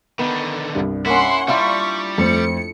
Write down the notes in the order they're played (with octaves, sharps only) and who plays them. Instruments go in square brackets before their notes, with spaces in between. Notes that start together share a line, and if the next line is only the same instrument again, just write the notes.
[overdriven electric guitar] D3 D#3 [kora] B3
[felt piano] C2 G2
[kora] A#3 C#4 [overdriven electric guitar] E4 [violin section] F#5 C6
[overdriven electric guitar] G3 [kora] D4 E4 F4 [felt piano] F5 [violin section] C#6
[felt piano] F2 A3 C5 [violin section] C#7